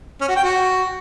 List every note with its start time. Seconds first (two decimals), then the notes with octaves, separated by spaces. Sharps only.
0.21 C#4
0.28 F#4
0.36 G5
0.43 F#4